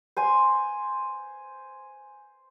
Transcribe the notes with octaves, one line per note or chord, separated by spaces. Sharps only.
C5 G#5 C6